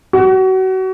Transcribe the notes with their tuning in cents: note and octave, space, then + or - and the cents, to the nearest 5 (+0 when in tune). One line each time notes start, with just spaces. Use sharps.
F#4 +30